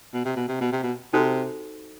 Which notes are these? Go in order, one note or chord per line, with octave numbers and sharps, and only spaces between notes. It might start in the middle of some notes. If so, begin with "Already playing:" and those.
B2
C3
B2
C3
B2
C3
B2
C3 D#4 F#4 A4 C5